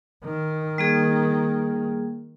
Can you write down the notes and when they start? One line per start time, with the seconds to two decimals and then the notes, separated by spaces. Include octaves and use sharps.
0.24 D#3
0.78 G3 A#3 G#4